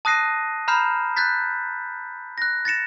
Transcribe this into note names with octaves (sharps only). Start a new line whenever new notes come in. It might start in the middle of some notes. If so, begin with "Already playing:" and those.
A5 D#6 F#6 A#6 C7 D#7
A#5 B5 F6 G6 C7 E7
F#6 G6 A6 B6
F#6 A#6
A6 A#6 C#7 E7